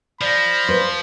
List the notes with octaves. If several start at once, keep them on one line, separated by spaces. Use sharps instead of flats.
F3 D5 B5 A#6
B4 C5